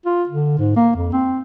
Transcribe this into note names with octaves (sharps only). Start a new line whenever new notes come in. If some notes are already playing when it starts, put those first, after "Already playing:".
F4
D3
G#2
A#3
F2
C4